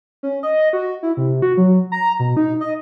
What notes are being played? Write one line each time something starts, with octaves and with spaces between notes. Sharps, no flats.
C#4
D#5
F#4
E4
C3
F#4
F#3
A#5
B2
D#4
D#5